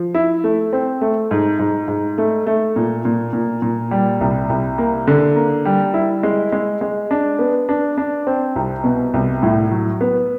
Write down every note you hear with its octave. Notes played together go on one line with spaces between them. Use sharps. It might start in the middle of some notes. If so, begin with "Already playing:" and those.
Already playing: F3
E4
A3
C4
A3
G#2
G#2
G#2
A3
A3
A#2
A#2
A#2
A#2
G3
C2
C2
A#3
D3
A#3
G3
E4
G#3
G#3
G#3
D4
B3
D4
D4
C4
C2
B2
C2
A2
F#3
B3